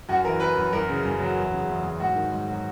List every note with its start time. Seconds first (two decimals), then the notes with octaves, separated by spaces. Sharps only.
0.09 F#2 F#4
0.24 E3 A#4
0.40 E3 B4
0.56 F#2
0.73 F#2 A#4
0.89 C#3
1.04 F#2
1.20 F#3
1.36 E2
1.52 C#3
1.68 E2
1.84 F#3
2.00 G#2 F#4
2.15 D#3
2.32 G#2
2.48 F#3